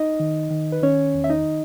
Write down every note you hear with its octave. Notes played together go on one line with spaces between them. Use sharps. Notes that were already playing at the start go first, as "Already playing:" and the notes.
Already playing: D#4 D#5
D#3
D#3
B4
D#3 C#4 C#5
E2
E5
D#4 D#5